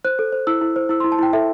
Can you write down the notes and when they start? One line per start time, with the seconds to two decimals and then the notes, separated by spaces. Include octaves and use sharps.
0.05 C5 F#6
0.19 A4
0.32 C5
0.47 E4 E6
0.61 E4
0.76 C5
0.89 E4 E6
1.00 C6
1.04 E4
1.12 A5
1.19 E4 G5
1.33 A4 E5